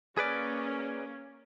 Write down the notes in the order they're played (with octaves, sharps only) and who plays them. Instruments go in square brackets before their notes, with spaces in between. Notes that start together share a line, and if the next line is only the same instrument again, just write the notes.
[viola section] A#3 C#4 [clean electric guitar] G#4 B4 D5